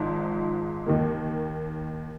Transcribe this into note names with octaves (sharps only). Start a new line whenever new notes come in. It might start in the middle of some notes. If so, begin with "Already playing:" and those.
Already playing: G#1 G#2 F3 G#3
D#2 D#3 A#3